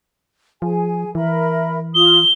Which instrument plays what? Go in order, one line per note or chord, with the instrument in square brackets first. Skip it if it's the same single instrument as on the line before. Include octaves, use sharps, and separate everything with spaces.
[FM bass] F3 [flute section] G#4 G#5
[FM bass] E3 [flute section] A#4 E5 B5
[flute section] F4 D#6 [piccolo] G7